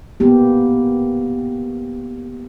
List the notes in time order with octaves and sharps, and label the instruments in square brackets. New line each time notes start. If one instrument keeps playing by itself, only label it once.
[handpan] A#3 B3 G4